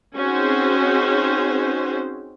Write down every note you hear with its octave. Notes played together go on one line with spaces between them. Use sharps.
C4 C#4 D#4 F#4 G#4 C5